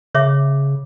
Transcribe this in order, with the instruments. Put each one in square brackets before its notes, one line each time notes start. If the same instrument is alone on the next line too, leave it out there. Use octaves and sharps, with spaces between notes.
[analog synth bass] C#3 [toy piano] C#5 E5 D6